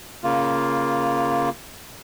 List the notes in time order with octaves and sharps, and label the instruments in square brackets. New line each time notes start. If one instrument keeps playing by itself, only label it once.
[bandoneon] C#3 A#3 F4